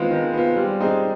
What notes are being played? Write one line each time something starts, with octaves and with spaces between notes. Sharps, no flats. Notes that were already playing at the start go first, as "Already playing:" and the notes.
Already playing: D#3 G#3 B3 C4 F4
D#3
B3 F4
G3
C4 D#4 G#4